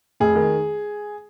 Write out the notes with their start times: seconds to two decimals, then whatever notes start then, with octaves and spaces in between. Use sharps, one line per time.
0.20 F1 G#4
0.35 D#3